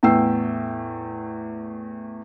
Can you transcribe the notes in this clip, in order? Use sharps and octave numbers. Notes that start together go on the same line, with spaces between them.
E2 A2 G5 E6 C7